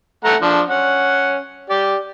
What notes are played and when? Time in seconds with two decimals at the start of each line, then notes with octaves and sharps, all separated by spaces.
0.25 A3 F#5 A#5
0.42 F3 D4
0.68 C#4 F#5
1.70 G4 D5